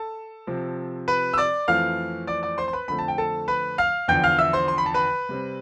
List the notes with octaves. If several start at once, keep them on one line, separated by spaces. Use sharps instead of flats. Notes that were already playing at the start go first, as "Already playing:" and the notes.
Already playing: A4 A5
C3 F3 C4
B4 B5
E6
D5 D6
F2 E3 A3 C4 F5 F6
D5 D6
D5 D6
C5 C6
C6
B4 B5
F2 D3 A3 C4 B5
A5
G5
A4 A5
B4 B5
F5 F6
E2 D3 F3 G5 G6
F5 F6
E5 E6
C5 C6
C6
B5
A5
B4 B5
C3 G3 C4